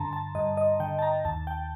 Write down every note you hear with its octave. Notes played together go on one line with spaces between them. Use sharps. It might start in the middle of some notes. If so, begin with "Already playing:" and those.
Already playing: G2 D3 A5 A#5 C6
A5
G2 D#5
D#5
D3 G5
A5
A#5
D#2 A5
G5